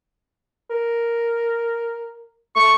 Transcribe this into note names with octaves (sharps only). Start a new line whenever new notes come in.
A#4
A3 C#6